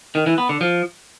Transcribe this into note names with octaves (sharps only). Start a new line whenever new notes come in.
D#3
E3
B3
D3
F3